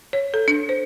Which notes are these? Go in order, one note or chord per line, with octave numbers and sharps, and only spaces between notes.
C#5
A4
D4
C5